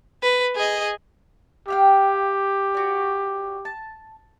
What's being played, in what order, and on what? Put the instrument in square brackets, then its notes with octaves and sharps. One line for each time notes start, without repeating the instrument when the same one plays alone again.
[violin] B4
G#4 D#5
[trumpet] G4 [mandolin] E5 F5 G5
[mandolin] F#4 D5
A5